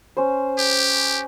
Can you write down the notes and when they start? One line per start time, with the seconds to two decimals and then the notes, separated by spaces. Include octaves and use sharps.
0.17 C#4 C5
0.58 G4